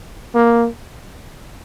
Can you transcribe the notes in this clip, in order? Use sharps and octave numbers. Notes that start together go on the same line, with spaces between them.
A#3